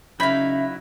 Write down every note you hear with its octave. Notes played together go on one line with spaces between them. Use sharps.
C#3 F#3 D#4 E4 E5 F5 B5